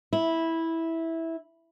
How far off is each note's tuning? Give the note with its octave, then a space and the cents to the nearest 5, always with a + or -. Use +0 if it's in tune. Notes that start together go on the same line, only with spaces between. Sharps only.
E4 -10